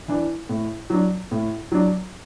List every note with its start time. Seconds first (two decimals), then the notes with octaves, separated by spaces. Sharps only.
0.08 E3 D4
0.49 A2
0.90 F#3 D4
1.31 A2
1.72 F#3 D4